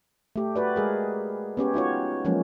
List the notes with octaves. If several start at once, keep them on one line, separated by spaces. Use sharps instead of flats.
A3 G4
F#4 B4 D5
G#3 G#4 A#4
B3 C#4 G4 C#5
D#4 F4 F#4 C#5
F3 F#3 G#3 A#3 C#4